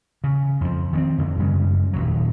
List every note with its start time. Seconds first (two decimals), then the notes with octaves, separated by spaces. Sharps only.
0.24 C#3
0.61 F2 F3
0.93 D#3 B3 C4
1.18 F2 D3
1.38 F#2 C#3 G3 G#3
1.93 D#1 G#1 F#3